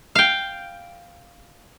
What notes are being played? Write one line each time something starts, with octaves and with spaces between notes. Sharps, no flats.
F5 G5